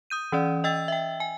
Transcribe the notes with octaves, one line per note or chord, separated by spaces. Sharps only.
D#6 G6 D#7
E3 C#4 D5
D#5 G5 E6 A6
E5 G5
G#5